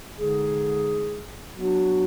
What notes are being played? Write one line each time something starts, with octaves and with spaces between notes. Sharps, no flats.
D3 G#3 D#4 G#4
F#3 B3 D4 F#4